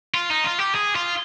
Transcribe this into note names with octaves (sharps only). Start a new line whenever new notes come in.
F4
D#4
F4
G4
G#4
F4